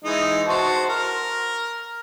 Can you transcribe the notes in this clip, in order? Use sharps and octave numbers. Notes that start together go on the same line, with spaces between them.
E3 G#3 D#4
F#4 C5 A5
A#4